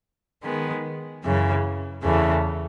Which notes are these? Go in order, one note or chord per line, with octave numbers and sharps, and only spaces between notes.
D#3 G#3 B3
F#2 C#3 E3
E2 C#3 E3 A3